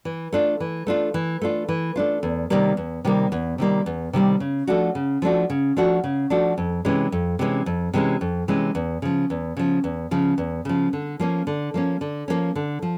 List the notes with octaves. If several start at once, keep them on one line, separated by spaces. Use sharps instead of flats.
E3
A3 D4 F4
E3
A3 D4 F4
E3
A3 D4 F4
E3
A3 D4 F4
E2
C3 D#3 G3 A#3
E2
C3 D#3 G3 A#3
E2
C3 D#3 G3 A#3
E2
C3 D#3 G3 A#3
C#3
F3 A3 D4 F#4
C#3
F3 A3 D4 F#4
C#3
F3 A3 D4 F#4
C#3
F3 A3 D4 F#4
F2
C3 E3 G#3 C#4
F2
C3 E3 G#3 C#4
F2
C3 E3 G#3 C#4
F2
C3 E3 G#3 C#4
E2
C#3 F3
E2
C#3 F3
E2
C#3 F3
E2
C#3 F3
D3
F3 A#3 C#4
D3
F3 A#3 C#4
D3
F3 A#3 C#4
D3
F3